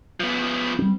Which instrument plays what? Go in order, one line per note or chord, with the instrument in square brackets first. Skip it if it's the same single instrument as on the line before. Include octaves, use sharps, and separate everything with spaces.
[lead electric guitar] F3 B3
[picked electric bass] G3 C4